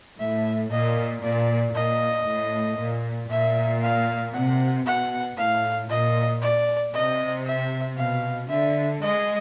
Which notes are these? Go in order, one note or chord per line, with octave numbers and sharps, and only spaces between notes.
A2 E5
A#2 D#5
A#2 D5
A#2 D#5
A2
A#2
A#2 E5
F5
C3 F#5
B2 F#5
A2 F5
A#2 D#5
D5
C3 D#5
E5
B2 F5
D3 E5
G#3 D#5